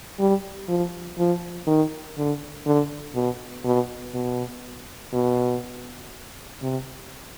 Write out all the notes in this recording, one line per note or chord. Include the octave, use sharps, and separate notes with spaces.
G3
F3
F3
D#3
D3
D3
B2
B2
B2
B2
C3